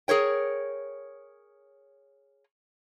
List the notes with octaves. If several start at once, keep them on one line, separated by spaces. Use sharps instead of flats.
G#4 A#4 C#5 G5